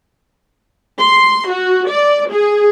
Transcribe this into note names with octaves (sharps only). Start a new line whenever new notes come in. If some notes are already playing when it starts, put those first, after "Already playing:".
C6
F#4
D5
G#4